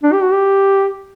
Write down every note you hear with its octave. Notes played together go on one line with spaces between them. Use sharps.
D4
G4
F#4
G4